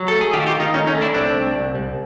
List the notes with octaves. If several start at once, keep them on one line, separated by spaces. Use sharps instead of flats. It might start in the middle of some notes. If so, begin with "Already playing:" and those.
Already playing: F#3
A3 A4
G#4
D#3 F4 G4
F#4
F4 G4
D#3
D#4 F4
A3 C#4 D#4
C#4 D#4
A3
D4 E4
C2 C4 D4
C2
C2
C2